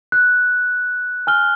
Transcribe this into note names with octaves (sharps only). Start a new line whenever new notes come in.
F#6
G#5 F6 G7